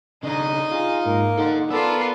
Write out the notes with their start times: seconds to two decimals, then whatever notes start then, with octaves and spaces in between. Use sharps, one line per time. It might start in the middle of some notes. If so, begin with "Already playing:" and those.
0.23 C#3 D4 D#4 D#5
0.71 F4 G#4
1.05 G#2 A#3 A#4
1.38 D#4 A4 F#5
1.70 B3 F4 A4 A#4 D5 E6